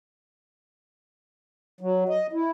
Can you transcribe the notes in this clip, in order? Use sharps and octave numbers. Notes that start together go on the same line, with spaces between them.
F#3
D#5
E4